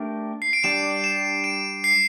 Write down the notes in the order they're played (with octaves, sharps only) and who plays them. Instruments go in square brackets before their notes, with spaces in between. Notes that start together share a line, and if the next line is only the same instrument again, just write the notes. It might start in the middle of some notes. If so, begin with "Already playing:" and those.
Already playing: [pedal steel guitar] A3 D4 G4 A#4
[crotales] C7
D7
[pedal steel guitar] G3 D4 G4 D5 [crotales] E7
[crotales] E7
D7
C7